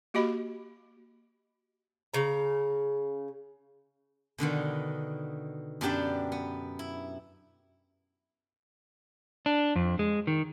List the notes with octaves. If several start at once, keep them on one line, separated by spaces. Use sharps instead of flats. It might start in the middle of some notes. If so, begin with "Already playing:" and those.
A#3 F#4 G4 D#5 B5
C#3 A#5
B2 D3 D#3 B3
F#2 B3 D4 G4 A5 B5
B3
E4
D4
F2
G#3
D#3